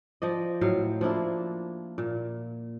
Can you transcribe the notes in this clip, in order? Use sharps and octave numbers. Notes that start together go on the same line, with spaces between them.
F3 D5 D#5
A2 F#3 F5
F3 A#3 D4 E4
A#2